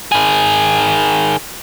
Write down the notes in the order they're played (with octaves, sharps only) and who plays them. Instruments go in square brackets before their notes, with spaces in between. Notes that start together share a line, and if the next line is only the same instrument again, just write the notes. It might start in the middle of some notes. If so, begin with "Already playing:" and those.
[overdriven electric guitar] D#3 G#4